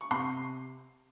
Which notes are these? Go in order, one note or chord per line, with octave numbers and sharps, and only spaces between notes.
C#6
C3 C6